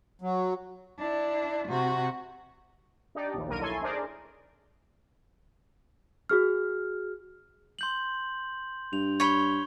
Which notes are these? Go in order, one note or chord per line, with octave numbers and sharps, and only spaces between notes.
F#3
D4 E4
C3 F#4
D4 D#4 G4 D5
A#1 D#2
B1 A#3 A#4 D#7
E4 A4 C#5 G#5 C6
D4 D#4 G#4 A#4 C5 D5
F#4 G#4 F6
C6 G6 F#7
G2 F7
C#5 B5 G#6 G7